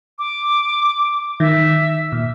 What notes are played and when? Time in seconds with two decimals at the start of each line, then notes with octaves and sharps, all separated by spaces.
0.19 D6
1.40 D#3 E5
2.12 A#2